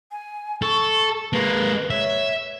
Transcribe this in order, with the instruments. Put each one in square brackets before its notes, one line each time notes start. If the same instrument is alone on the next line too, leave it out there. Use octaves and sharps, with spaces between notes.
[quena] G#5
[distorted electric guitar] A4 [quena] C#6
[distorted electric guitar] G#3 A#3 [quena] B4
[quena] C#5 [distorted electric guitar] E5